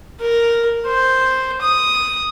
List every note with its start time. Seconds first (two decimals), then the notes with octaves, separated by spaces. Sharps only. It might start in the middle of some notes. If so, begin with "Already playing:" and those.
0.20 A#4
0.87 C5
1.61 D#6